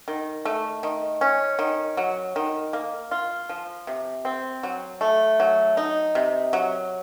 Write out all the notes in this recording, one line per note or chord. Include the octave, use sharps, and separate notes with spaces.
D#3
A3
D#3
C#4
D#3
F#3
D#3
A#3
F4
F3
C3
C4
F#3
A3
F#3
D#4
C3
F#3